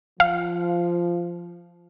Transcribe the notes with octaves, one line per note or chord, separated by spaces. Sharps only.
F3 F5